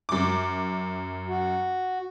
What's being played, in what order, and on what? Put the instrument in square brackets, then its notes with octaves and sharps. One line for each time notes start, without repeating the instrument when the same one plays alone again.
[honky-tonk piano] F#2 D6
[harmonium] F#4